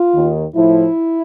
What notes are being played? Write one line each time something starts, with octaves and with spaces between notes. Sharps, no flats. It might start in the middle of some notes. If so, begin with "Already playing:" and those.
Already playing: F4
D#2 D#3
A2 F3 E4